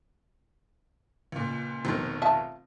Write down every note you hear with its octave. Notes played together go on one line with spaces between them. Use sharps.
C#2 A#2
F1 B2 D#3 C4
F4 E5 A5